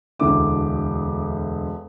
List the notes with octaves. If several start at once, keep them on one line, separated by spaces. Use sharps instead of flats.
E1 D2 D3 A3 E4 D6